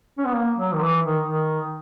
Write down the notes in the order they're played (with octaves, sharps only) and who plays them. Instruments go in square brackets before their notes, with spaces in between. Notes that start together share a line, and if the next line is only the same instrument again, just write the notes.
[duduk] C#4
B3
A#3
F#3
D#3
E3
D#3
D#3